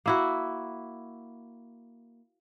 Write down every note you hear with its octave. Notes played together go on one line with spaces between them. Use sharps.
A#3 E4 F#4